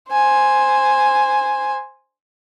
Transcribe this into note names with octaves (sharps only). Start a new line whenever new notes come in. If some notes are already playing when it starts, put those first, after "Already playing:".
C5 G#5